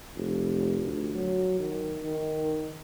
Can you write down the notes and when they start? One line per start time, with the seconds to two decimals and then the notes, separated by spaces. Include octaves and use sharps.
0.16 F1
0.84 D2
1.15 F#3
1.59 D#3
2.03 D#3